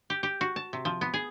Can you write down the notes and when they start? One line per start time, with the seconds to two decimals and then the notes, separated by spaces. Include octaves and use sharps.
0.10 G4
0.23 G4
0.41 F#4
0.56 A5
0.73 C3
0.85 F3
1.01 B3
1.14 G#4